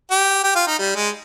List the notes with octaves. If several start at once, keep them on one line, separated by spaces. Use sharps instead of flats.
G4
G4
F4
D#4
G3
G#3